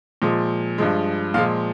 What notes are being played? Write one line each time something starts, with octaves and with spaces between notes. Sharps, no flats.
A#2 F3 G#3
G2 F3 G#3
A#2 F3 G#3 F5